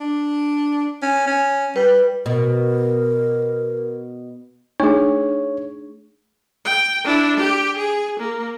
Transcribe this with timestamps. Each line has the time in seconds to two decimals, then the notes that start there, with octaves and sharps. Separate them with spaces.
0.01 D4
1.02 C#4
1.27 C#4
1.76 G3 B4
2.26 B2 A#4
4.80 A3 D4 D#4 G#4 C#5
6.65 G5
7.05 D4 E4
7.36 G4
7.77 G#4
8.20 A#3